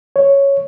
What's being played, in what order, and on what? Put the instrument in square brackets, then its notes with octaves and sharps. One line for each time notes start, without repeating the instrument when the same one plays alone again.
[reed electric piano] C#5